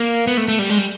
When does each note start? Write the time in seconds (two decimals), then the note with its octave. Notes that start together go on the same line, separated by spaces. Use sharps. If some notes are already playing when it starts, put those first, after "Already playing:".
Already playing: A#3
0.27 B3
0.37 A3
0.48 A3
0.59 G3
0.70 G#3
0.78 G3